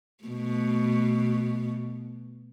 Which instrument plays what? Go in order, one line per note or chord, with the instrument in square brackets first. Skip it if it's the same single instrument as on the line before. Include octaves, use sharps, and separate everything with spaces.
[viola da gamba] B2 A3